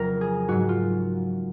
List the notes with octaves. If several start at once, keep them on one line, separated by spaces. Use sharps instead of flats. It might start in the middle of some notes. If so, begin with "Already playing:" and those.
Already playing: F2 C#3 F#3 A#4
G#4
G#2 F#3 F#4
F4